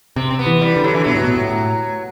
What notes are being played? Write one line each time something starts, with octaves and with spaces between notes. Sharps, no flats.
C3 C4
C4
B3
E3
G3
D3
F#3
E3
B2 F#3
A2
B2
A2